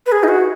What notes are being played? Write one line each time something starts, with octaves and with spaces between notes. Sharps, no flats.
B4
G#4
D#4
F#4